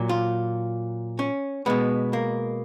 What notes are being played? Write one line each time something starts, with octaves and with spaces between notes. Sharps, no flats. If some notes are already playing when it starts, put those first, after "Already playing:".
Already playing: A#2 F#3
F4
C#4
B2 G#3 B3
A#3